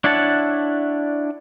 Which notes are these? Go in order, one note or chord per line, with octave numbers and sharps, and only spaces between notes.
D4 E4 C#5 F#5 A5